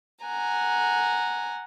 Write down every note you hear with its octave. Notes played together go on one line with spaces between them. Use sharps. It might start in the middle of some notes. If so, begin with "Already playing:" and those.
F#5 G#5 A#5